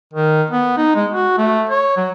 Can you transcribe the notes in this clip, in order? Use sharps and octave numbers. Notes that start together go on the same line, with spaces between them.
D#3
B3
D#4
G#3
F#4
A3
C#5
F#3